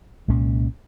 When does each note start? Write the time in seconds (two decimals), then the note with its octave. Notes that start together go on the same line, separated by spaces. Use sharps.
0.28 C2 A#2 G#3 C#4